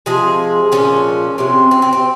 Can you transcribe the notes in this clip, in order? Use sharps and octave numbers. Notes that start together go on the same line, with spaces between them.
C3 F3 G#3 G#4
A#2 F3 G#3 C#4
C3 F#3 C4
C4
C4
C4